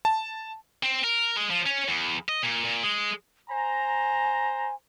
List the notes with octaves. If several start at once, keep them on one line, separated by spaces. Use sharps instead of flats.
A5
C4
A#4
G#3
F3
C#4
E2
D#5
A#2
A#2
G#3
C5 G#5 A#5